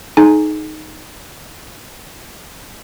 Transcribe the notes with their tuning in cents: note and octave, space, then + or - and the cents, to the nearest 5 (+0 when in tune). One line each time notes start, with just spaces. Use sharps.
D#4 +0 G#4 +45 G#5 +0